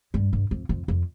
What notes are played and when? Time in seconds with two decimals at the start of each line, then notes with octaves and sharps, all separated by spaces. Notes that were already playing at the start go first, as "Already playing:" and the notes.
0.14 G2
0.33 G2
0.51 F2
0.69 F2
0.88 F2